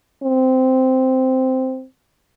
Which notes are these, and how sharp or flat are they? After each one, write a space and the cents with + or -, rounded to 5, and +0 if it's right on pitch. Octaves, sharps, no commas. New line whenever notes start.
C4 -10